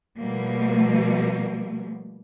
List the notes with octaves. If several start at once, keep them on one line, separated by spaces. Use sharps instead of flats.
B2 F3 G3 A3 A#3